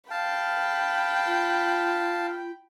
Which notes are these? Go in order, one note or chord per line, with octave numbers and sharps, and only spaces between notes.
F5 G5 A5 B5
F4